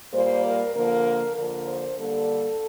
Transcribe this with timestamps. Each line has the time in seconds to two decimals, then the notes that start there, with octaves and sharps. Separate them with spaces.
0.13 A#2 G3 A#3 C5
0.44 A#4
0.74 D3 F3 A#3 A#4
1.36 D3 F3 A#3 A#4
1.67 C5
1.99 D3 G3 A#3 A4